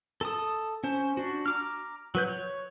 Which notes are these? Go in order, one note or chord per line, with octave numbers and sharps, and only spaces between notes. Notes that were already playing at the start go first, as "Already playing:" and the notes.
A4 A5 D#6
C#4 C5
D4 F#4
A#5 D6 F6
F#3 B4 G6
C#5